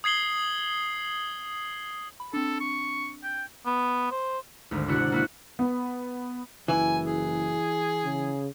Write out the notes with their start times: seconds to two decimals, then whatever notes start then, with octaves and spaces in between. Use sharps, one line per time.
0.04 D#6 G#6 C7 F#7 G7
2.20 B5
2.34 C4 D4 A4
2.60 C#6
3.23 G5
3.66 B3
4.11 C5
4.71 G#1 D2
4.88 C3 D4 E4 F#4 F#5
5.12 A#3 E4 F#4
5.59 B3
6.68 F#1 E3 E4 G#5
7.06 G#4
8.05 C#3